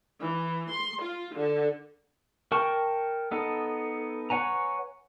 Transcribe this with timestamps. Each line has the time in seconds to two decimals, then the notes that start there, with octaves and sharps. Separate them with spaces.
0.19 E3
0.71 C6
1.01 F4
1.35 D3
2.52 A#4 G5 A5 C#6
3.31 B3 D#4 A4
4.30 B4 C#5 F#5 G#5 A#5